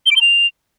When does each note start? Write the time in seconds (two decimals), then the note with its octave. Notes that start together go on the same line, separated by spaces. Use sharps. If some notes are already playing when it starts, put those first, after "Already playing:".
0.06 G7
0.11 D7
0.16 G7
0.21 F7